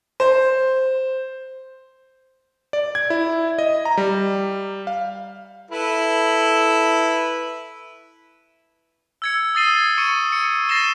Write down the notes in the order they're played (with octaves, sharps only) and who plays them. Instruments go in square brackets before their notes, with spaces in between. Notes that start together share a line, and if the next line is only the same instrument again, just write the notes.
[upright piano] C5
[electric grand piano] D5
G#6
E4
D#5
A#5
G3
F5
[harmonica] E4 A4 B4
[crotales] E6 G#6 C#7
D#6 E6 A6 C7 D#7 G7
C#6 C#7 D#7
C#7
A6 A#6 C7 D#7 E7 G7